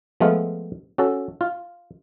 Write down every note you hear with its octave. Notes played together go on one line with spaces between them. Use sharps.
F3 G#3 A3 B3 F4
C#4 F#4 A4
F4